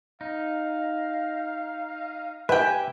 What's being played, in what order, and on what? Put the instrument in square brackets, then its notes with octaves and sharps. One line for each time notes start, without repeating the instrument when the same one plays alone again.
[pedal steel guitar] D#4 [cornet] F5
[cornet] G4 [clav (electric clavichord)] B4 [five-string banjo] E5 G5 [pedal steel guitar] G#5